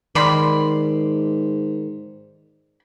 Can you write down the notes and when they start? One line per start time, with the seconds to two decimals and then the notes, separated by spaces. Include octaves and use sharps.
0.15 G#2 D#3 D5 B5 C6